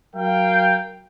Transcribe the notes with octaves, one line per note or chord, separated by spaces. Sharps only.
F#3 A#4 F5 G5